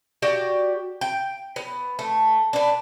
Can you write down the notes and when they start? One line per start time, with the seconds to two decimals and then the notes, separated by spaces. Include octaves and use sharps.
0.22 F#4 G4 D5
1.01 G5
1.56 B3
1.99 A3
2.53 D4 B4